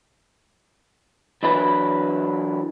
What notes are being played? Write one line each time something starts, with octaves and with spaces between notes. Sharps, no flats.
E3 F#3 D4 E4 B4